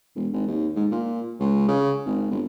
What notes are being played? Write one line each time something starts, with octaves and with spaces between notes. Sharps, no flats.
E1
G#1
D#2
G#2
A#2
C#2
C#3
G#1
G1